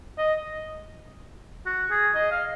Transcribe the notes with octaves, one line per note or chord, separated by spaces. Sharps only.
D#5
F#4
G#4
D#5
F5